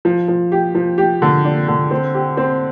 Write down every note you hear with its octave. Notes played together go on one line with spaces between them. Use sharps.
F3
F3
G4
F3
G4
D3
D4
D3
C4
G4
C4